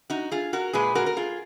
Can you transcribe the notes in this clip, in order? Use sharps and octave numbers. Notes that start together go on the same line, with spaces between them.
D#4 F#4
F4 G#4
F#4 A#4
A#2 G#3 G#4 B4
F#4 A#4
A#4
F4 G#4